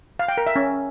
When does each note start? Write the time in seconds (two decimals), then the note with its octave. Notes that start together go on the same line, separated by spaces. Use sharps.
0.19 F5
0.28 G5
0.38 A#4
0.47 E5
0.56 C#4